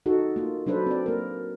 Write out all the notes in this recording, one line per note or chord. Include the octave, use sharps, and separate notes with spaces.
D#4 F#4 A4
A#3 F4
F#3 D4 A4 B4 C5
C4 D5
A#3 A#4